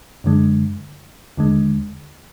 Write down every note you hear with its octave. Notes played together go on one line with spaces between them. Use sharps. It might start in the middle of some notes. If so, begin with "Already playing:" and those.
F#2 D3 G#3
D#2 D3 G#3